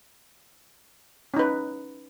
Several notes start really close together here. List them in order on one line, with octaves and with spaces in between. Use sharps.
C#4 D#4 B4